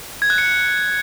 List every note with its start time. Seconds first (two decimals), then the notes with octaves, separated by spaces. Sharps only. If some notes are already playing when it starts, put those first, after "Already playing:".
0.22 G#6
0.30 F#6
0.38 C#7